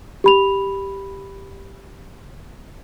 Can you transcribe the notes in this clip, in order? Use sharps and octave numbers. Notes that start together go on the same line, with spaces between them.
G4 B5 F7